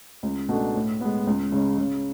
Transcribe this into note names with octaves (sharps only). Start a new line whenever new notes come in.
C#2
B2 A3 D4
A2
G#3 B3
C#2
C#3 G#3 C#4
C#3